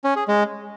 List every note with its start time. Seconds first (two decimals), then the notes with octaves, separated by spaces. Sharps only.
0.04 C#4
0.16 G#4
0.28 G#3